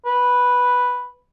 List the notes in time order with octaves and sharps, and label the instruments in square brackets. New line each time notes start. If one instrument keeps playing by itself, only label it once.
[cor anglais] B4